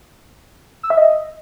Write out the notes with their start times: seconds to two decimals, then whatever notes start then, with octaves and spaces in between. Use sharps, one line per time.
0.83 E6
0.90 E5
0.97 D#5